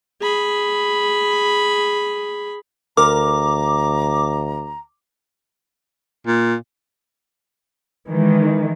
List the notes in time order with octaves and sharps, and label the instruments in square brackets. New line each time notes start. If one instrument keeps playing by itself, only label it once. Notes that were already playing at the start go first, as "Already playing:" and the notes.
[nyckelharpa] G#4 B5
[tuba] D2 [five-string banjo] A#4 [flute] A#5 [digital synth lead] D6
[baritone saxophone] A#2
[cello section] D#3 E3 G#3